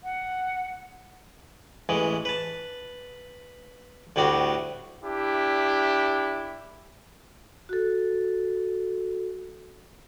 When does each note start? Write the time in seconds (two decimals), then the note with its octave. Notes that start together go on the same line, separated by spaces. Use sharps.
0.04 F#5
1.89 A1 E3 G#3
2.25 B4 A5
4.16 D2 A2 G3 D4 F#4
5.03 D4 E4 G4
7.69 F#4 A4